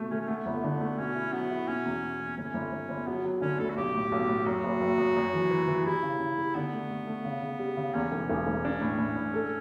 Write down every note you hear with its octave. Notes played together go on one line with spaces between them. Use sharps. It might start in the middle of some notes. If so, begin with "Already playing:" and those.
Already playing: B2 A3
A3 C#4
C#4
A3 B3
G1
D3
A3
B2 C#4
E4
F#3 B3
E4
B2 C#4
E2
B2
E2
G1 C#4
G1
G1
G1
F#3 B3
F#3
D3 C#4
D2 A4
F#4
B1 G4
A2
B1
A2
F#2 F#4
F#1
F#1
F#2
F#2
E3
E3
E3
G3 E4
C#3
C#3
G3
D3 B3
A3
A3
A3
C#3
C#3
G3
C#3
E2 C#4
E1
E1
E1
D4
A2
A2
A2
A4